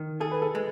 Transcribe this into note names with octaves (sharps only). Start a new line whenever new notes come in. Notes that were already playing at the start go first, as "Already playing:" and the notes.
Already playing: D#3
G#4 A4
B4
A4
G#3